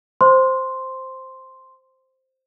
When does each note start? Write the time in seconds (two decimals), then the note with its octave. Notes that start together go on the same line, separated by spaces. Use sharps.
0.21 C5 C6